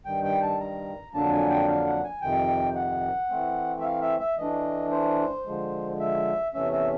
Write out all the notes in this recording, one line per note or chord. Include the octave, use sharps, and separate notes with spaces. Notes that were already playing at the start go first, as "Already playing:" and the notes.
G2 D#3 G3 G5
G5
A5
A#5
F2 D3 F#3 A#3 D4 A5
G#5
G5
F5
F#5
G#5
F2 C3 D#3 G5
F#5
E3 A3 C4
E5
F5
E5
E5
E3 A3 D4 D#5
C5
D3 F3 G#3
E5
E2 C3 E3 A3 C#4 E5
E5